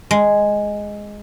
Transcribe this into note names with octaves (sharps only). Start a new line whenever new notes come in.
G#3